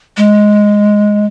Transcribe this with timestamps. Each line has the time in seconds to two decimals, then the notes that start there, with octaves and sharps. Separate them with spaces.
0.17 G#3